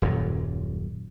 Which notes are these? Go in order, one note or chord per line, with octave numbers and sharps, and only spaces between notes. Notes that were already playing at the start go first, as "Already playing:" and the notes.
D#1 F#2 A#2 F#3